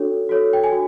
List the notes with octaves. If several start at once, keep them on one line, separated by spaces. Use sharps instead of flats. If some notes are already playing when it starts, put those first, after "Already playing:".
Already playing: D4 F#4 A4 C#5
F#4 A4 C#5
G5
G#5
F#4